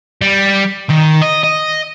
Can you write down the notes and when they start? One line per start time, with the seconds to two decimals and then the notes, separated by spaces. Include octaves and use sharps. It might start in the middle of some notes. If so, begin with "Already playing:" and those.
0.22 G3
0.90 D#3
1.22 D#5
1.43 D#5